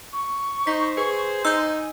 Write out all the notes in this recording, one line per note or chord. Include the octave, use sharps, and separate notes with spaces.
C#6
D#4 C5 B6
G#4 B4
D#4 G#5 E6 G6